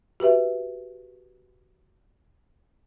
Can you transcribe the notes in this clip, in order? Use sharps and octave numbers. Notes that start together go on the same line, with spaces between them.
F#4 G4 B4 E5